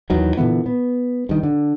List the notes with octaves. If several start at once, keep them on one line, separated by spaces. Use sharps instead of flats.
D#2 D#3 E3 F#3
A#2 D3 E3 B3
B3
G2 D#3
D3